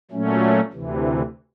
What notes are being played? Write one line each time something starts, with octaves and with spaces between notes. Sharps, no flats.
A#2 F#3 A3 C#4
D2 C3 E3